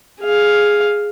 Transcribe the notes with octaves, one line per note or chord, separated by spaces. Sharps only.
G#4 F5